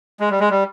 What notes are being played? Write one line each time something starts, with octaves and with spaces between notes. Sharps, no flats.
G#3
G3
G#3
G3